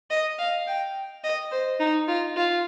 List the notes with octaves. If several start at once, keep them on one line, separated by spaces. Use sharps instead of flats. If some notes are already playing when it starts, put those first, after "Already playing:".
D#5
F5
G5
D#5
C5
D#4
F4
F4